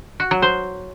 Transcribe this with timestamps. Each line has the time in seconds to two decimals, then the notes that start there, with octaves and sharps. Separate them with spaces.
0.20 F#4
0.31 F#3
0.42 C5